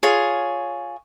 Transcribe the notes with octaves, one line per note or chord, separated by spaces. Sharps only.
F4 G#4 C#5